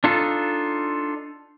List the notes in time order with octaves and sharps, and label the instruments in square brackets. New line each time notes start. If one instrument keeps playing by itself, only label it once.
[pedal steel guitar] D4 D#4 F4 A4